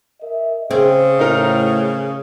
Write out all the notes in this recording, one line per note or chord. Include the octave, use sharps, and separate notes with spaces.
A#4 D#5 E5
C#3 C4 G#4
A2 D#4 A#4